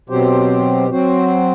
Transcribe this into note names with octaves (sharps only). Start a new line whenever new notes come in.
B2 F#3 C4 G4 C5
F#3 C4 F#4 C5